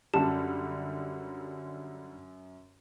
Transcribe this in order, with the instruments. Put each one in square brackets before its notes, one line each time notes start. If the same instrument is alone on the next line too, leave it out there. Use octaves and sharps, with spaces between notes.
[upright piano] F#2 [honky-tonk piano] D3 G3 [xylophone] A5